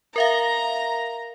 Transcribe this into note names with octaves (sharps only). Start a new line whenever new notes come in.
A#4 E5 F5 A#5